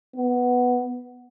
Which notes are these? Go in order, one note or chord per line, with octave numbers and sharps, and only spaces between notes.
B3